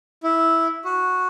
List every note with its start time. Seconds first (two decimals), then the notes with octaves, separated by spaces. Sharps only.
0.23 E4
0.85 F#4